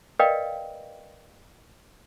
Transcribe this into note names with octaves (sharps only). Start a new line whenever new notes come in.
A#4 B4 D5 D#5 F5 G5